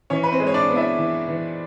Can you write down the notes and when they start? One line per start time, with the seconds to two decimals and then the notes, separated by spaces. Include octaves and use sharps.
0.10 E3 C#4 C#5
0.23 B4
0.32 C4 C5
0.40 G#3
0.47 C#5
0.54 D4 D5
0.69 B3
0.76 E4 E5
0.99 E3
1.28 E3